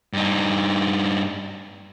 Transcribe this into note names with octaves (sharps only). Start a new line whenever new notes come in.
G2 D#4